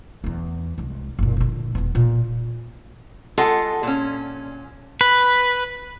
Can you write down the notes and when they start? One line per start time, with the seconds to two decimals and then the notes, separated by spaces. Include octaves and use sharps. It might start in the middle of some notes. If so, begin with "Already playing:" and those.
0.24 E2 B3
0.78 C2 G#3
1.19 F#1 A#2
1.37 A#2 D3
1.75 E1 B3
1.95 A#2
3.37 G#3 F4 G#4 A4 D#5 F#5
3.83 A#2 C#4
5.01 B4